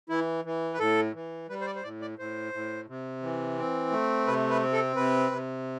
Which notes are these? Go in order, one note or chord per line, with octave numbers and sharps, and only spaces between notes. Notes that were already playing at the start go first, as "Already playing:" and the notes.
E3 E4
E3
B4
A2 A4
E3
G3 B4
C5
D5
C5
A2 D5
D5
A2 C5
A2
C3
E3
C4
A3
C3 B4
B4
C4
A4
C3 B4
C3